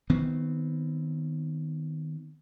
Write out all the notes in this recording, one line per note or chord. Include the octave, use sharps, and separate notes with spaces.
D#3 B3 C4